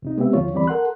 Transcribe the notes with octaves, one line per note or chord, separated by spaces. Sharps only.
C2 C3 D#4
G#3 B3 C4 G4 E5
D#2 D3 F3 F4 C#5
D2 E3 G3 C4 D5 B5
A4 A#4 F#5 C6 F#6